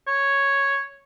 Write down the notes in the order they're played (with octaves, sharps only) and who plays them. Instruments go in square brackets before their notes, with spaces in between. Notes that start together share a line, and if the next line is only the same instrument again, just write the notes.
[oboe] C#5